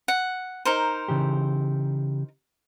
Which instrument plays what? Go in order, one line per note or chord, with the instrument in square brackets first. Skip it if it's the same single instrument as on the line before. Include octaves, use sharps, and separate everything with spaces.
[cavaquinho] F#5
D#4 A#4 C5
[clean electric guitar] C#3 E3 G4